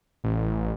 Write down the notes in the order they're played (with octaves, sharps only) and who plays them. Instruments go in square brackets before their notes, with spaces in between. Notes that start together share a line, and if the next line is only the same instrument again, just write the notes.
[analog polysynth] A1